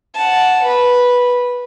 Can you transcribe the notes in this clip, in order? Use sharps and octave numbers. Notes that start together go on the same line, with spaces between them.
F#5 A5
B4